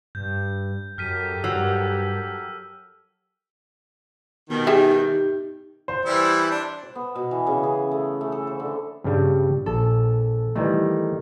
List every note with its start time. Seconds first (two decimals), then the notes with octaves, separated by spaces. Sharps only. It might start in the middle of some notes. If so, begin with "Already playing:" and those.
0.15 G2 G6
0.98 F#2 G4 A4 A#4 F6 B6 D#7
1.44 G2 F#3 E6
4.50 B2 D#3 G3
4.67 D#4 G4 G#4 E5
5.88 C5
6.05 E3 G3 E4
6.51 D4
6.83 C5
6.95 B3
7.15 B2
7.31 E3
7.47 C#3
7.63 G#4
7.91 A3
8.21 A3
8.32 A4
8.47 C5
8.60 D3
9.04 G2 C#3 G3
9.66 A#1 A4
10.56 D#3 E3 G3 A3